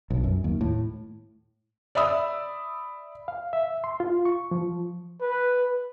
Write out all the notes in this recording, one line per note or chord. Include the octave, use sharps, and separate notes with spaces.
B1
F#2
D#2
A2
D5 E5 B5 D#6 E6
F5
E5
C6
F4
C#6
F3
B4